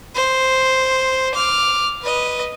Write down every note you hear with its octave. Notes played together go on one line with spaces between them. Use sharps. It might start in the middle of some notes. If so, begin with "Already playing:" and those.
C5
D6 F6
B4 D#5